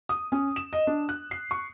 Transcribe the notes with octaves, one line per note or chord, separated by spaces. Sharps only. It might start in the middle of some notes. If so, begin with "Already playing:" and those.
D#6
C#4
E7
D#5
D4
F#6
C7
C#6